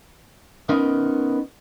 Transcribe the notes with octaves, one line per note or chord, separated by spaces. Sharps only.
B3 C#4 D#4 A#4 D#5